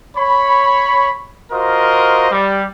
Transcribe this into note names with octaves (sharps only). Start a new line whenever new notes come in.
C#5 B5
F4 F#4 A#4 C5 D#5
G3